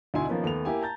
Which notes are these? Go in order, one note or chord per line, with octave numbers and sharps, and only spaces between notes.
D2 B2 D#4 E4 G#5 C6
D#3 F3 A#3 B3 C#4
D#2 A3 B3 F7
A#3 E4 G4 G#5
A5 A#5 G6 A6